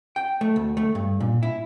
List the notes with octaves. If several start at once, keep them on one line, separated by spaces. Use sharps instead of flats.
G5
A3
D2
A3
G2
A#2
E4